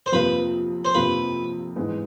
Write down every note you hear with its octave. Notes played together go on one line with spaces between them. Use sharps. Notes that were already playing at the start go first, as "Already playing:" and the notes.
C5
F2 C3 F3 A#3 B4
C5
F2 C3 F3 A#3 B4
G#2 E3 G#3 B3